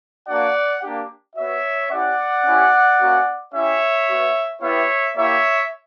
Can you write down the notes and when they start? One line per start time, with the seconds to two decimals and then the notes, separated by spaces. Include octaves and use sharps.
0.27 A#3 D4 F#4 D5 F#5
0.82 A#3 D4 G4
1.36 B3 F#4 C#5 E5
1.90 C#4 E4 G4 D5 F#5
2.45 C#4 E4 G4
2.99 A#3 C#4 F#4
3.53 C#4 E4 G4 C#5 E5
4.08 B3 F#4
4.62 B3 E4 G4 C#5 E5
5.16 A#3 E4 G4 C#5 E5